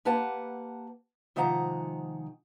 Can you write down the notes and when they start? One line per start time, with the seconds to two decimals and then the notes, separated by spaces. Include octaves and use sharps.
0.05 A#3 G4 B4 F#5 A5
1.36 C3 D#3 F3 G#3 F#5 A#5